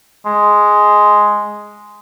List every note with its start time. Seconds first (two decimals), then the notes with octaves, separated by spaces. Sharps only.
0.26 G#3